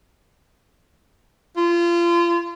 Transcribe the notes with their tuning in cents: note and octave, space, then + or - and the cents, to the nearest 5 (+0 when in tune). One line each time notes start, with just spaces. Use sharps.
F4 -30